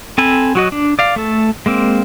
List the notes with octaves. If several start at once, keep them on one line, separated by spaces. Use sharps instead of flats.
C4 A4 G#5 B5
F#3 F#4 D#5
D4
D5 F5
A3 A4
G#3 A#3 C4